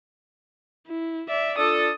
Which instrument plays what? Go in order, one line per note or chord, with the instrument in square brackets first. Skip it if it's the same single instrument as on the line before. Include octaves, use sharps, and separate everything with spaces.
[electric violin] E4
D5 E5
[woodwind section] D4 F4 A4 [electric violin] D#6